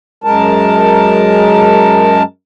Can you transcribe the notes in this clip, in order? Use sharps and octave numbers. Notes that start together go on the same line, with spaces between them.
F#2 G#3 A#4 A5